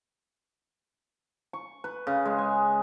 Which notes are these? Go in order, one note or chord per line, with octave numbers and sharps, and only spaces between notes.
C#6
B4
C#3
G#3
G#5